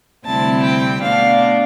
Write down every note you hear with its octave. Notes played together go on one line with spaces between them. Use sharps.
D2 C3 G3 C4 E4 A5
G5
B2 A3 D4 F5